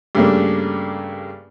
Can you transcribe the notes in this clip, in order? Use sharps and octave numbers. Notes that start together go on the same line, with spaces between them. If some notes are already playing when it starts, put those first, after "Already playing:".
G2 C#3 A3 A#3 D4